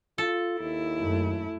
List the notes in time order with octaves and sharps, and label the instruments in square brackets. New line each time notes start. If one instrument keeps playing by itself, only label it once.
[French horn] F4 [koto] A4
[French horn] D#2 [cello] E4
[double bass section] F#2 A3